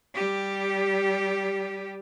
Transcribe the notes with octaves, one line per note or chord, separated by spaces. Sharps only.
G3 G4